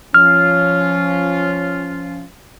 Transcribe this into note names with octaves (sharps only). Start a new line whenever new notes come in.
F3 C#4 F4 F6